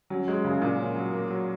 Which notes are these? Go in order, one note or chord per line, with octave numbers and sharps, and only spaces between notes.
F#3 C#4
F#3 G#3
F#2 C#3
F#2 A#2
C#4
F#3
A#3
F#3